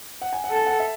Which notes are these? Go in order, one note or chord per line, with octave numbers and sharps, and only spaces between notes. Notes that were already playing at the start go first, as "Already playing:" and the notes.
F#5
G#5
F#5
A4 G#5
F#5
E5